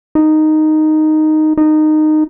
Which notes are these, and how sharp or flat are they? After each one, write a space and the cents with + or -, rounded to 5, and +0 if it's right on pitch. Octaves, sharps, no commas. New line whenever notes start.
D#4 -5
D#4 -15